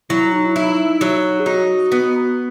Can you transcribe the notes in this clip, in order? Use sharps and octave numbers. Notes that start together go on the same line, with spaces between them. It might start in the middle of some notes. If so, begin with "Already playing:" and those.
F#3 E4
D#4
E4
D#4 E4
F#3
G#4
D#4 F#4
B3